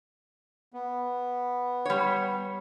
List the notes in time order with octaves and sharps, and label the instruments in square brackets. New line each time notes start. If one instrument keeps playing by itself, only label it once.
[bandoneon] B3
[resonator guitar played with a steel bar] G3 C#5